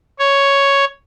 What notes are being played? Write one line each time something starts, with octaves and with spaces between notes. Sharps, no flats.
C#5